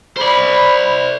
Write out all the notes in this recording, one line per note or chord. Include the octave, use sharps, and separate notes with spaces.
A#4 C5 D5 B5